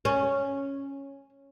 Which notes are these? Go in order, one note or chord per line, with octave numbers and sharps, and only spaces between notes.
C#4